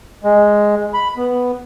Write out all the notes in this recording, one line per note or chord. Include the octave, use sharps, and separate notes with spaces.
G#3
B5
B3